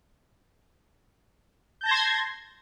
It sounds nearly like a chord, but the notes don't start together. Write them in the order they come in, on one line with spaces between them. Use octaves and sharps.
G6 A5 A#6 G#6 C6